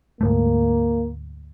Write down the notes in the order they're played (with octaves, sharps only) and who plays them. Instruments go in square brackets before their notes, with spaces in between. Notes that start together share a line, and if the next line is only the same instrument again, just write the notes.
[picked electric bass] D2 G#2 A3 [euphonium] A#3